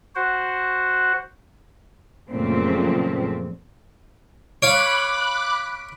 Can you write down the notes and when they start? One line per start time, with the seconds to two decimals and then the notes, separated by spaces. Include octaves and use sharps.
0.16 F#4 C5 F#5
2.32 F#2 A#2 C#3 F3 A3 C4
4.62 C#5 F5 B5 D6 F#6 D7